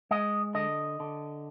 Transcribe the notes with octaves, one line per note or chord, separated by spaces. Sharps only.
G#3 D#5
D3 D#5
D3